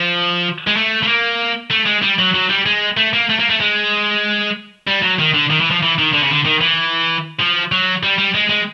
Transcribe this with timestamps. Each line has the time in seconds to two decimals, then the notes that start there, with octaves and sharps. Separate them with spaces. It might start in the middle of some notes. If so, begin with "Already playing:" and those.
Already playing: F3
0.67 G#3
0.76 A3
1.03 A3
1.07 A#3
1.71 A3
1.86 G#3
2.02 G3
2.19 F#3
2.34 F#3
2.49 G3
2.66 G#3
2.97 A3
3.13 A#3
3.29 A3
3.39 A#3
3.50 A3
3.60 G#3
4.87 G3
5.02 F#3
5.19 D#3
5.34 D3
5.50 D#3
5.60 E3
5.71 F3
5.82 E3
5.98 D#3
6.13 D3
6.22 C#3
6.31 D3
6.45 D#3
6.61 E3
7.40 F3
7.72 F#3
8.03 G3
8.19 G3
8.35 G#3
8.50 G#3